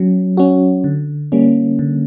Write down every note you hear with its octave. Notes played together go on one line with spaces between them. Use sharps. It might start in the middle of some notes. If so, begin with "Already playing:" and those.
Already playing: F#3 C#4
C#4 F#4
D3
G3 A#3 C#4
D3